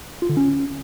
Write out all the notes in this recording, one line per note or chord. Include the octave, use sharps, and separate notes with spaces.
F4
D3
C#4